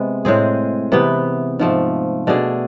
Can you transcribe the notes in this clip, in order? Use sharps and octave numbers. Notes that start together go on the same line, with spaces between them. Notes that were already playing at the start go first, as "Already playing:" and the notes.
Already playing: C3 G#3 B3
A2 G#3 C4 G#4
C3 E3 B3
G#2 F3 A3
B2 A3 D4 G#4